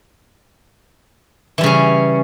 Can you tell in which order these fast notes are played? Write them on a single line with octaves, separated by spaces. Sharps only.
E3 G3 C#3 C#4